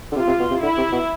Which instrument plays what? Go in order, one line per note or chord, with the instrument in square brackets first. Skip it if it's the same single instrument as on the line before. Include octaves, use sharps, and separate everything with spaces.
[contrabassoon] D3
[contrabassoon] C3 [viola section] F4
[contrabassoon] C3
B2
C3
[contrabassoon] D3 [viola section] E4
[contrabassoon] C3
B2